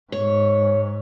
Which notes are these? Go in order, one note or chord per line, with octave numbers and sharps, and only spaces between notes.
G#2 C#5